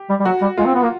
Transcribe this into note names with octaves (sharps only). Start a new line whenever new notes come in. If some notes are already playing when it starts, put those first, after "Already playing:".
Already playing: G4
G3
G3
F#3 F#4
G3
G#3 F4
C4
B3
A#3